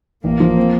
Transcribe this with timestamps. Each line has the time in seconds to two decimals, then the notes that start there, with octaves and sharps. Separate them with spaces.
0.24 A1 A#3
0.40 F3
0.57 C4